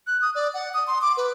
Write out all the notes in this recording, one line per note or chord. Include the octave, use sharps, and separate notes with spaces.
F#6
D#6
D5
F#5
D#6
C6
D6
B4